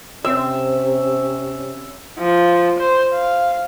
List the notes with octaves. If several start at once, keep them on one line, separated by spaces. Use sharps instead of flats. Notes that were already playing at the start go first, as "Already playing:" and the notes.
C3 C4 C#4 E5
F3
C5
F5